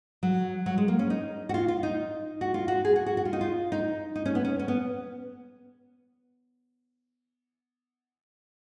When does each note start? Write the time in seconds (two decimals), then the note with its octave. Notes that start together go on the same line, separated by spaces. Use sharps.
0.23 F#3
0.66 F#3
0.78 G#3
0.88 A#3
0.99 C#4
1.10 D#4
1.49 F#4
1.54 F4
1.68 F4
1.83 D#4
2.41 F#4
2.54 F4
2.68 F#4
2.85 G#4
2.96 F#4
3.06 F#4
3.17 F#4
3.25 F4
3.33 D#4
3.41 F4
3.72 D#4
4.16 D#4
4.26 C#4
4.35 B3
4.45 C#4
4.59 C#4
4.68 B3